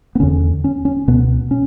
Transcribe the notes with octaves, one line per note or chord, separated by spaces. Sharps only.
B3
E2 D3 C#4
C#4
C#4
C#2 B2 B3
C#4